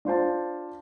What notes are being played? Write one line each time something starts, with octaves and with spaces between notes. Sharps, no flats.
D4 F4 C5 A5